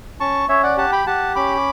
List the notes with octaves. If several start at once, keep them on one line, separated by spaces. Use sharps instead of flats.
C#4 A5 C#6
C#4 C#5 E5
D5 F#5
G4 F#5 A5
G5 B5
G4 F#5 A5
C#4 B5 D6